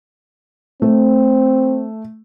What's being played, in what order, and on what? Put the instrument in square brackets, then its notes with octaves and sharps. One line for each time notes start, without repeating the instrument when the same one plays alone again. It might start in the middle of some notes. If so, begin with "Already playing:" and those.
[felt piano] A3 [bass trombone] C4